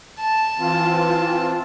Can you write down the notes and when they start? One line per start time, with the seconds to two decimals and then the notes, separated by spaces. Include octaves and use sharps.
0.19 A5
0.59 E3 C4 F4